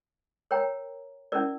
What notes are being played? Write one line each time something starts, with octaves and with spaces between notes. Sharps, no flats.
A#4 C#5 G5 A#5
C#4 E4 A#4 D5